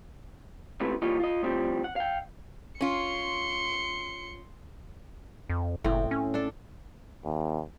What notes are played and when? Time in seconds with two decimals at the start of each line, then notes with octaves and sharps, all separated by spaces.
0.80 C#2 A2 C3 A3 B4
1.02 E3 G3 A#3 F4 C#5 D#5
1.20 F4 D#5
1.43 A2 F3 G3 C4
1.84 F#5
1.96 F5 G5
2.81 C#4 F4 C6 C#7
5.50 F2
5.84 F#1 A2 C4
6.11 C#4
6.34 D4 A4
7.25 D#2